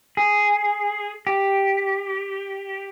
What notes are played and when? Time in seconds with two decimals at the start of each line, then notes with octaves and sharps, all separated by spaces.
0.17 G#4
1.27 G4